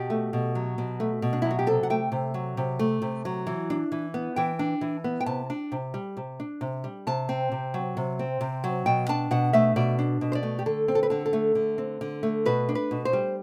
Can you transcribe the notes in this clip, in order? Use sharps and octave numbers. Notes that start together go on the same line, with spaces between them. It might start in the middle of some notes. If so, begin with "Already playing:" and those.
Already playing: B2 G4
A3
B2
F#3
B2
A3
B2
D4
F#3 E4
F#4
G4
C3 A4
F#5
A3 G5
C3
F#3
C3
A3
C3
F#3
E3
D4
E3
B3
E3 G5
D4
E3
B3
G5
C3 A5
D4
C3
G3
C3
D4
C3
G3
C3 A5
C4
C3
F#3
C3
C4
C3
F#3
B2 G5
D4 A5
B2 F#5
A3 E5
B2 D5
D4
B2
C5
D5
A3
G4
D3 A4
C4
A4
B4
D3 A4
A4
A3
D3
C4
D3
A3
B2 B4
D4
B4
B2
C5
G3